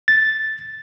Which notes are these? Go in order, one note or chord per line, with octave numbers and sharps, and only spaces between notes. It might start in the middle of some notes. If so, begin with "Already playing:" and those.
A6